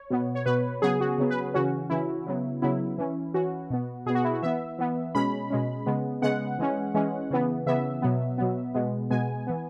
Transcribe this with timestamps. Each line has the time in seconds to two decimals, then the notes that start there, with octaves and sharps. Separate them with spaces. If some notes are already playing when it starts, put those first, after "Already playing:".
Already playing: C#5
0.10 B2 B3
0.35 C#5
0.46 B2 B3 B4
0.82 C#3 F#3 B3 G#4
1.00 F#4
1.18 C#3 F#3 B3
1.30 B4
1.54 C#3 E3 C#4 F#4
1.90 C#3 E3 C#4 E4
2.26 C#3 F#3 B3
2.62 C#3 F#3 B3 E4
2.98 E3 C#4
3.34 E3 C#4 F#4
3.70 B2 B3
4.06 B2 G#4
4.10 B3
4.15 F#4
4.24 E4
4.33 F#4
4.43 E3 B3 E5
4.79 E3 B3
5.15 B2 G#3 C#4 B5
5.50 B2 G#3 C#4
5.86 C#3 G#3 B3
6.22 C#3 G#3 B3 F#5
6.59 E3 G#3 C#4
6.95 E3 G#3 C#4
7.30 C#3 E3 B3
7.66 C#3 E3 B3 E5
8.02 B2 F#3 B3
8.38 B2 F#3 B3
8.74 B2 G#3 B3
9.10 B2 G#3 B3 G#5
9.47 E3 B3